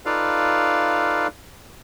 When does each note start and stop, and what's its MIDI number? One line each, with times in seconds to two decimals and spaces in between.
0.06 1.27 63
0.06 1.27 65
0.06 1.27 69
0.06 1.27 71
0.06 1.27 74
0.06 1.27 77